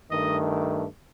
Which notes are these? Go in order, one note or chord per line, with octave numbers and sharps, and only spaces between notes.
G2 D#3 A3 D#5